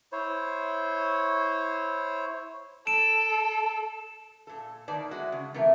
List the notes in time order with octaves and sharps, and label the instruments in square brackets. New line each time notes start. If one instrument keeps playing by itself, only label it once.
[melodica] E4 C5 C#5
[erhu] A4 [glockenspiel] D7 E7
[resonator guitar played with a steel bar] A#2 A4
A#2 D#3 A#3 D5 A5
G#3 A3 F#4
C#3
C3 E3 A3 A#4